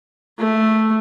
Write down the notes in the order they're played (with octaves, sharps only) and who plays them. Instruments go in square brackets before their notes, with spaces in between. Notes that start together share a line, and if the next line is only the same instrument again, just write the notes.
[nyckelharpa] A3